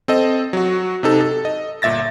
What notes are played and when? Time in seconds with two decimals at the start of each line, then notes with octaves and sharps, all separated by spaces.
0.08 C4 A4 D#5
0.53 F#3 F#4
1.03 C3 D#4 A4
1.21 A4
1.45 D#5
1.82 G1 A#2 E5 A6 A#6